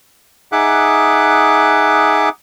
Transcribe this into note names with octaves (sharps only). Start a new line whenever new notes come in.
D#4 G#4 E5 F#5 D6 F#6